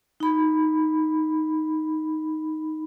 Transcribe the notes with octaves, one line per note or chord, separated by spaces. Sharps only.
D#4 B5